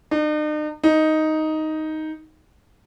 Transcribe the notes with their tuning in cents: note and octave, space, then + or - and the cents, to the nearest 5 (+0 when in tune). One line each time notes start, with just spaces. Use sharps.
D#4 -45
D#4 +5